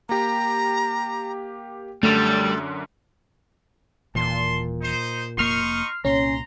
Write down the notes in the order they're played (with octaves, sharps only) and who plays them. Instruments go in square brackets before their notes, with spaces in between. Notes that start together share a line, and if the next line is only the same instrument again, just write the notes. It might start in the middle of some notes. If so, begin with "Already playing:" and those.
[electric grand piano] A#3 G4 [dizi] A#5
[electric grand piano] F#2 D3 [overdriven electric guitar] G3 [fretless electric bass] A3 [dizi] A4
[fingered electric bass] D#1 E3 [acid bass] A#2 [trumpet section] A5 C6
[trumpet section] D#4 C5
[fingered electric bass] F1 A#3 [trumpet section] D#4 C#6 [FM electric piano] C6 F6 C7
[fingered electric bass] C2 A#2 [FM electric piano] C#4 [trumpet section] A#5 C6